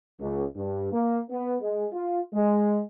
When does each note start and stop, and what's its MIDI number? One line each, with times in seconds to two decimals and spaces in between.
0.20 0.44 37
0.56 0.91 43
0.92 1.18 58
1.29 1.54 59
1.61 1.85 56
1.93 2.20 65
2.33 2.80 56